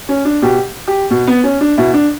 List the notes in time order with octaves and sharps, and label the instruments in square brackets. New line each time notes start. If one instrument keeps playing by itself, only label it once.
[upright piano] C#4
D4
B2 G4
G4
B2
B3
C#4
D4
B2 E4
D4